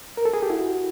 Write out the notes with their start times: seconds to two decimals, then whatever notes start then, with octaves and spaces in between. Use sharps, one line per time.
0.17 A#4
0.25 A4
0.34 G#4
0.43 G4
0.50 E4 F#4